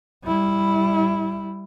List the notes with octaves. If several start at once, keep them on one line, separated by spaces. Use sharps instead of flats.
G3 E4